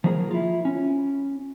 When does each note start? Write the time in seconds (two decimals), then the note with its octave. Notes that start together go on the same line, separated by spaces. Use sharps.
0.04 F3 F#3 A#3 G#4 A#4
0.31 E4 F4
0.65 C#4